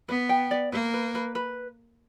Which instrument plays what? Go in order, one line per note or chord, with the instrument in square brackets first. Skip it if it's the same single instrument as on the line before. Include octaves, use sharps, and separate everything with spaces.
[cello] B3 [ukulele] B4
[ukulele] G5
D5
[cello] A#3 [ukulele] B4
[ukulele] B4
B4
B4